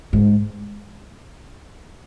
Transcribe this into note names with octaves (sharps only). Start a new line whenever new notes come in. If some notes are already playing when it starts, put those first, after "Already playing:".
G#2